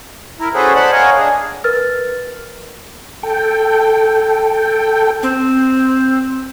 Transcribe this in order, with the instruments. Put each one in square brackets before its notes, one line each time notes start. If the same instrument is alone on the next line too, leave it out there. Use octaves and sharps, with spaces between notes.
[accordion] E4 A#4
C#4 F#4 G#4 A4 B4 C5
C5 D5 F#5 A5 B5
A#4 C#5 D#5 F5 F#5 G#5
D4 G#4
[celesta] A#4 B4 F6 A6
[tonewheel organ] A4 G5
[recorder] C4